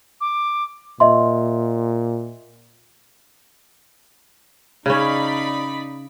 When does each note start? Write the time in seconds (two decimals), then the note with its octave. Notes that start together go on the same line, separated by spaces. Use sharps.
0.21 D6
1.00 A#2 D#5 E5 C6
4.86 C#3 C#4 D#4 D5 B5